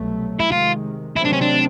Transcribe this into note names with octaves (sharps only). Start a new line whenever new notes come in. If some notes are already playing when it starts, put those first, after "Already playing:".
Already playing: C2 B2 F#3 A3
E4
C3 D#3 G#3 F4
C3 D#3 F#3 A3 C4 E4
D4
C#4
D4